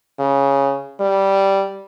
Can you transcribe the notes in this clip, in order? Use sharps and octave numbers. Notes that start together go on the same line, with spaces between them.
C#3
G3